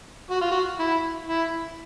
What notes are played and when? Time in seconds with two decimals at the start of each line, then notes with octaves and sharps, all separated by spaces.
0.31 F#4
0.41 F4
0.51 F#4
0.79 E4
1.29 E4